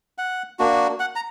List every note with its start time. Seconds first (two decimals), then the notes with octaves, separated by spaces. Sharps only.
0.18 F#5
0.59 A#3 D4 F#4
1.00 F#5
1.16 A#5